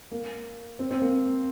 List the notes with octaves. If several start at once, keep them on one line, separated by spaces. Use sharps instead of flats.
A#3
C4
C4
A#3